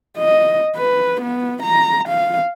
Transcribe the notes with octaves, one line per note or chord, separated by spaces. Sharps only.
D#5
B4
B3
A#5
F5